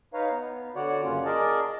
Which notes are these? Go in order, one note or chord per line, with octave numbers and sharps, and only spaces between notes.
D#4 B4 C#5 F5 A#5
B3
D3 F#4 C#5 D5 F#5
F#2 C#3 A#3 C#4 F4
G#4 A#4 D5 D#5 A5